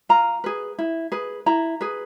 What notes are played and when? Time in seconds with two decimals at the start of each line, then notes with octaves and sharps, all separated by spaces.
0.09 F4 A#5
0.44 G#4 B4
0.79 E4
1.12 G#4 B4
1.46 E4 A#5
1.81 G#4 B4